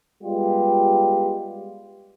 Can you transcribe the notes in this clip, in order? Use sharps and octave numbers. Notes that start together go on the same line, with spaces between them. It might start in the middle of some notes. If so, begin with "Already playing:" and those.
G3 G#3 B3 F4 G4